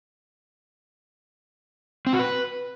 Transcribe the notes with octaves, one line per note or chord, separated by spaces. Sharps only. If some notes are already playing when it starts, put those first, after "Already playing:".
C4
F#4
B4